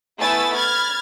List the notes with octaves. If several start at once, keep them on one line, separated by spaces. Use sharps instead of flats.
A3 B3 E4 G#5 E6 A6
B5 F6 G#6 A6